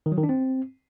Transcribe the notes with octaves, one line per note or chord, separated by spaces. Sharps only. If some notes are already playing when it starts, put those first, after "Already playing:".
D#3
F#3
D#3
D4
C4